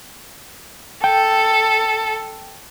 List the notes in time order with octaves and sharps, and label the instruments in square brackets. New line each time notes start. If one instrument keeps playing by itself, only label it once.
[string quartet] A4 [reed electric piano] G5